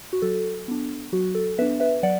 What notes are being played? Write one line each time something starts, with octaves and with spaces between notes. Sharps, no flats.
F#4
F#3 A4
B3 D4
F#3 F#4
A4
B3 D4 B4 E5
B4 E5
F#3 D5 F#5